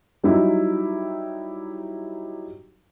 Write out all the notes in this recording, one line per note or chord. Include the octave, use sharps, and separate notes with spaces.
F#3 G3 D#4 E4